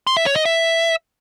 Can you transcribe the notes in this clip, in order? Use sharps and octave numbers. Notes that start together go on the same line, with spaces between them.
C6
E5
C#5
D#5
E5